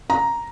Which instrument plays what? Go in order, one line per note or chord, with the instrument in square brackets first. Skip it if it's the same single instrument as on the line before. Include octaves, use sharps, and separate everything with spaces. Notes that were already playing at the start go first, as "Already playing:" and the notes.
[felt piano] A#5